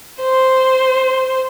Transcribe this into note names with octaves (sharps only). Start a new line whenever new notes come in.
C5